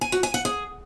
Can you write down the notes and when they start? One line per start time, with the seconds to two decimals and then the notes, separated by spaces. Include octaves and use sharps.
0.01 G#5
0.12 F#4
0.23 G#5
0.34 F#5
0.45 G#4